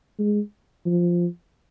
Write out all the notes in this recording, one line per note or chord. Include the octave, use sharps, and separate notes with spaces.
G#3
F3